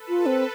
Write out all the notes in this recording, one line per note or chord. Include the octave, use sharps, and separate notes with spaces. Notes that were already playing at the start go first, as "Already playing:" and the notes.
Already playing: A4 B4
F4
C4